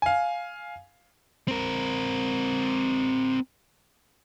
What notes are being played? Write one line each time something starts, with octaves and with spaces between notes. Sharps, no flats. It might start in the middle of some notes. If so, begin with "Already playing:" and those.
F5 G#5
C4 A#4